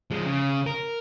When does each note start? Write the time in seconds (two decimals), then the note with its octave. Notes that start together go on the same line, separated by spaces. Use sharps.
0.11 F3 G#3
0.26 C#3
0.67 A#4